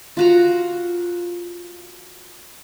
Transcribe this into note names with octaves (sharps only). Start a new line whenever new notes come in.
F4 F#4 A#5